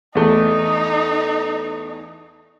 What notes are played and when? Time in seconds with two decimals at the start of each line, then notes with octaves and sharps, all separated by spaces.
0.15 E2 A3 D#4